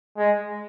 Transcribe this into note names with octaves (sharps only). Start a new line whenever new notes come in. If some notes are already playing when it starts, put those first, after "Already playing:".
G#3